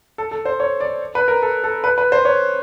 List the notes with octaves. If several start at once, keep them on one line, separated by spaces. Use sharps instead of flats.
A4
A4
C5
C#5
D5
B4
A#4
A4
A4
B4
B4
C5
C#5